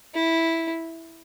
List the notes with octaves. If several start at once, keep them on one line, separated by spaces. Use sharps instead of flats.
E4